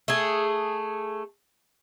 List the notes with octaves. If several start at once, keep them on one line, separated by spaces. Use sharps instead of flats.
A3 G#4